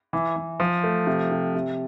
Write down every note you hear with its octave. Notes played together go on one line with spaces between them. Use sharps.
E3
E3
F3
A3
C3
C3
C3